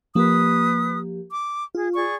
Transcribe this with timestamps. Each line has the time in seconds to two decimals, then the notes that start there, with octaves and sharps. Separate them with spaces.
0.15 F3 A#3 G4 B4 D#6
1.32 D6
1.75 F4 G#4
1.95 G#4 D5 C#6